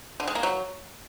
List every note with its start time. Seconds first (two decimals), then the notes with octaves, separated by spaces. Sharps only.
0.20 D3
0.28 G#3
0.35 A#3
0.43 F#3